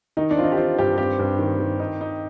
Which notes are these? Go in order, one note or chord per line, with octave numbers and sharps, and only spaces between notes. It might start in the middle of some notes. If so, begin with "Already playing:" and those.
D#3 D#4
D4
C4 F4
D#4
G4
C4 F4
G2 G4
C4 G4
G2
D#3
D#3
D#4
D#4